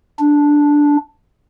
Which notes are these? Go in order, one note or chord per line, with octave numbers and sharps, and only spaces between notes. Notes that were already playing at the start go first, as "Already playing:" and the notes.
D4